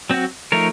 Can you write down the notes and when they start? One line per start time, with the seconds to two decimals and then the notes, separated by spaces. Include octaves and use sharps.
0.10 F#3 C4 F#4
0.52 F3 A3 D#4 A#4 C#5